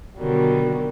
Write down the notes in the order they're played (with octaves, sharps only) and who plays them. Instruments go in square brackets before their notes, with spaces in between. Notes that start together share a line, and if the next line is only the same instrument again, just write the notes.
[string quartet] B2 D3 D#3 F#3 G3